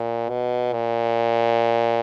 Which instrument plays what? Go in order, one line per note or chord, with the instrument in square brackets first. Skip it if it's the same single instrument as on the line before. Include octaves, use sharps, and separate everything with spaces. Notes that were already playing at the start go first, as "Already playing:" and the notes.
Already playing: [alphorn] A#2
B2
A#2